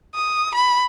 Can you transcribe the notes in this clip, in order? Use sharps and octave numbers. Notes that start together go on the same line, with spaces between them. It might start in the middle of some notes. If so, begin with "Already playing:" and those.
D#6
B5